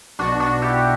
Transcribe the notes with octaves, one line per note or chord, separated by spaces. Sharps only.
B1 B2 D4 F#4
D4 F#4
E4 G4